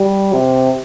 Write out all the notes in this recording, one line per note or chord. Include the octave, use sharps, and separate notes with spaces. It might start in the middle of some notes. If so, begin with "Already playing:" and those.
Already playing: G3
C3